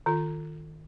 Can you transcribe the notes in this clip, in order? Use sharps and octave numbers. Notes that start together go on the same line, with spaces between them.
D#3 F4